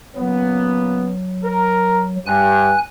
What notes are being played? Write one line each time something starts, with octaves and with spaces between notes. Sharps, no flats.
A#2 C#3 F#3 B3
A#4
G2 G#5 F#6